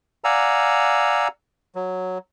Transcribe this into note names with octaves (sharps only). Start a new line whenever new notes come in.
D5 F5 F#5 G#5 A#5 E6
F#3